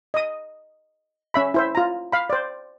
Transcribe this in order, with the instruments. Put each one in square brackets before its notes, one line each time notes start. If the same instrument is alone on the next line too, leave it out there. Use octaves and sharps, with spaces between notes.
[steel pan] D#5 D#6
C#4 E5 B5
E4 C5 E5
F4 A#5
F5 B5
C5 D5